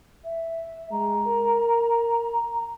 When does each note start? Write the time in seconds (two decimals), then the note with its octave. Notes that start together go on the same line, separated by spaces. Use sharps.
0.24 E5
0.91 G#3 A#5
1.27 A#4